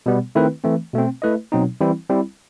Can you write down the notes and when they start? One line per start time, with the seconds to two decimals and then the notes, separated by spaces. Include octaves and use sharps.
0.06 B2 G3 B3
0.35 D#3 A3 C4 E4 B4
0.64 E3 A3 C4
0.94 B2 A3 C4
1.22 A3 E4 B4 D#5
1.52 B2 F#3 C4 D#4
1.80 E3 G3 C4 E4
2.10 G3 C4 E4